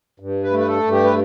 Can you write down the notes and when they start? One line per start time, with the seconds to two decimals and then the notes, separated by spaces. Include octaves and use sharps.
0.20 G2
0.43 B4
0.51 A3
0.59 B4
0.68 A4
0.83 G2
0.92 G4
1.04 B4